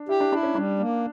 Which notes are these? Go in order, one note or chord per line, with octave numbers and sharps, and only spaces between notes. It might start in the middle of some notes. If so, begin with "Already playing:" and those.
Already playing: D4
E4 G4
D4
D4 E4
C#4
G3 D4
A#3